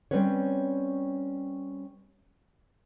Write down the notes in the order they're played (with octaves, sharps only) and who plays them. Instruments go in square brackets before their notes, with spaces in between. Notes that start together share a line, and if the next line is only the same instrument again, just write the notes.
[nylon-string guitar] G3 C4 C#4 B4 C#5